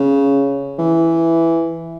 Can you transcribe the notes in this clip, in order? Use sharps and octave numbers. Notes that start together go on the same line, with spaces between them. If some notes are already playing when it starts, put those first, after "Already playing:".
Already playing: C#3
E3